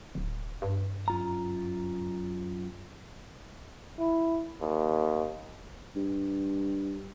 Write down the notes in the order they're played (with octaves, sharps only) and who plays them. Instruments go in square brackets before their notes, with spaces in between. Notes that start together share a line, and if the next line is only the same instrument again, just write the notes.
[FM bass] D1
G2
[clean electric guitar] F#2 F4 A#5
[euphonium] E4
D#2
[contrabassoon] G2